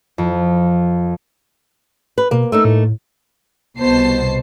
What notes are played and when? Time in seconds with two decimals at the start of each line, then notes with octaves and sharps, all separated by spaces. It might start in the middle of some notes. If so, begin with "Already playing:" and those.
0.18 F2
2.18 B4
2.31 B2 A#3
2.52 A3 A#3 D#4 E6
2.65 A2
3.79 C2 B2 C5 A5 C7